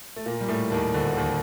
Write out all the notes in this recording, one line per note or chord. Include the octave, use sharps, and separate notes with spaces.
A3
A#2 A#3
G3
A2 A3
D#2 D#3
D2 D3
D#2 D#3